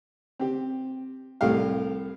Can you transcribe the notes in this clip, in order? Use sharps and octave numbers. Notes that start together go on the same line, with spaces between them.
C4 G4
C2 A2 C4 G4 F5